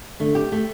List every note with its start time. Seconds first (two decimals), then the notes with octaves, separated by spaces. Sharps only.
0.20 D3 A3
0.35 G4
0.52 A3